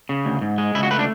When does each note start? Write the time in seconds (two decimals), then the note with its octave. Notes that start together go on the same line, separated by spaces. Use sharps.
0.09 C#3
0.25 D2
0.41 G#2
0.58 G#3
0.75 C#2 E4
0.83 F#4
0.90 A3 B4
0.99 D4